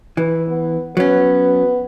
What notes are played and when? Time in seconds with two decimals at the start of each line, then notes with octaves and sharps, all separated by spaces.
0.17 E3 B4
0.49 B3
0.97 F#3 B3 C#4